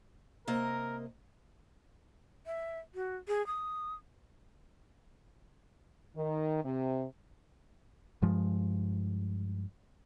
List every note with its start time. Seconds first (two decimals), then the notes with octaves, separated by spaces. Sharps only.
0.47 C3 A#3 A#4 D#5
2.46 E5
2.95 F#4
3.28 G#4
3.47 D#6
6.17 D#3
6.65 C3
8.22 G2 F3 G#3